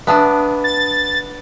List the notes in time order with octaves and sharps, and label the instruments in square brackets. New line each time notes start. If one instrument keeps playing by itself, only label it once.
[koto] B3 D4 [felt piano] E5 A5 D#6
[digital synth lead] A6